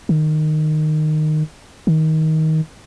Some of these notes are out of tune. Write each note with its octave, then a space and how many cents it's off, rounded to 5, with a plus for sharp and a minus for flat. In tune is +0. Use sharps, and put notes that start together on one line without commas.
D#3 -15
D#3 +20